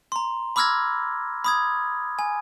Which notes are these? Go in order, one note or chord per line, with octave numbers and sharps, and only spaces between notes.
A#5 C6
B5 D6 E6 F6 G#6 A#6
B5 D#6 G#6
G#5